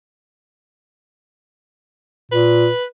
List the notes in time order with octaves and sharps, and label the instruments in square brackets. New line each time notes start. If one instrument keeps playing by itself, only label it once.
[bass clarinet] A#2 [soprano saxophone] B4